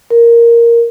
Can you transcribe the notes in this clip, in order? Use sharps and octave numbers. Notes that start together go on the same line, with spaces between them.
A#4